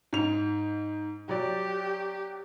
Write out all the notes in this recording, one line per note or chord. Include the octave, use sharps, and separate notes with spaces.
G#2 F7
F#3 G4 D5